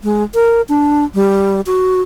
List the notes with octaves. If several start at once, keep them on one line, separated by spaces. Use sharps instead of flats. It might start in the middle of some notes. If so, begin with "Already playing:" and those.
G#3
A#4
D4
G3
F#4